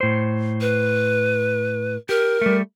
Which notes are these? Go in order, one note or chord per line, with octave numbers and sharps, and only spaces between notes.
A2 C5
B4
G4 A#4
G3 A3